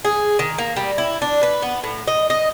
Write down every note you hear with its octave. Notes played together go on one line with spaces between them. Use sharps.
G#4
D#3
A#3
G3
E4
D4
B4
B3
A2
D#5
D#5